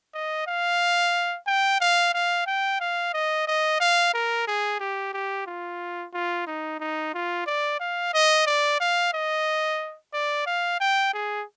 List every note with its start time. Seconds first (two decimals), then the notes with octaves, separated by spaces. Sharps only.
0.14 D#5
0.47 F5
1.47 G5
1.81 F5
2.14 F5
2.47 G5
2.81 F5
3.14 D#5
3.48 D#5
3.81 F5
4.14 A#4
4.48 G#4
4.80 G4
5.14 G4
5.47 F4
6.14 F4
6.47 D#4
6.80 D#4
7.14 F4
7.47 D5
7.80 F5
8.14 D#5
8.47 D5
8.80 F5
9.14 D#5
10.14 D5
10.47 F5
10.80 G5
11.14 G#4